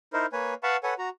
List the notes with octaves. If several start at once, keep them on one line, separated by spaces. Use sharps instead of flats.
D#4 E4 A#4 C5
A#3 B4 C#5 G#5
B4 F5 F#5 A5 B5 C#6
A4 B4 C#5 F#5 G#5
F#4 A#5